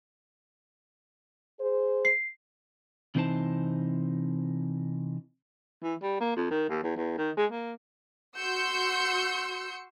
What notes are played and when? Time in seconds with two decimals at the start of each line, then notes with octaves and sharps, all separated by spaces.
1.60 G#4 C5
2.05 C7
3.15 C3 E3 C4 D#4 C5 A5
5.83 E3
6.02 G3
6.20 A#3
6.36 F2
6.51 D#3
6.69 D#2
6.83 E2
6.96 E2
7.17 D#3
7.37 G#3
7.51 A#3
8.37 F#4 C6 E6 G6 C#7